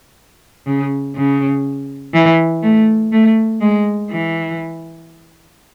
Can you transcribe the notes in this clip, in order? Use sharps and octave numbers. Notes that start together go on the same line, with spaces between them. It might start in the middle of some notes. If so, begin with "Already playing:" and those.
C#3
C#3
E3
A3
A3
G#3
E3